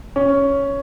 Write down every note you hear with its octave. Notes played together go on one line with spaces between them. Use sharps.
C#4